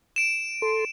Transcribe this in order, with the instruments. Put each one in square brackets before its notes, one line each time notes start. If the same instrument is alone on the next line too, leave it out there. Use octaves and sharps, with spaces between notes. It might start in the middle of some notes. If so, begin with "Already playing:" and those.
[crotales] D7 E7
[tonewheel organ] A4 C6